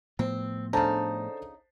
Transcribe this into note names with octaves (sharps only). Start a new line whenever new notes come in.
A2 F3 B3 C4
C#3 D4 D#4 A4 C5 A5